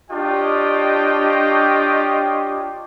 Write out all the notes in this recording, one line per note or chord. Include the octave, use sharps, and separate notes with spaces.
D4 F4 G4 C#5 D#5 G5